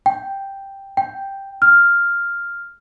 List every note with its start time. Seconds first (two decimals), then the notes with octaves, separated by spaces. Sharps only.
0.06 G5
0.97 G5
1.62 F6